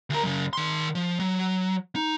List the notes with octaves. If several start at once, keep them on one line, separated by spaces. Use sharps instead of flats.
D2 A#4
F#2 C#3
D#3 C6
F3
F#3
D#4